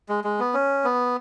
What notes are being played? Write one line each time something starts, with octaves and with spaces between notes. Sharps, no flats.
G#3
G#3
B3
C#4
B3